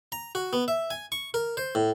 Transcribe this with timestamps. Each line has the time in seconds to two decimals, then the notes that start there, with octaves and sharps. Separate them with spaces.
0.12 A#5
0.35 F#4
0.53 B3
0.68 E5
0.91 G#5
1.12 C#6
1.34 A#4
1.57 C5
1.75 A2